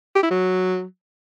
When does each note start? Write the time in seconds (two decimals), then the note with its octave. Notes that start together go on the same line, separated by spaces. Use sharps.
0.15 G4
0.23 E4
0.31 F#3